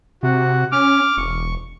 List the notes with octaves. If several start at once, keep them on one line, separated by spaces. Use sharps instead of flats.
C3 F#4
C#4 D6 F6
E1 C#6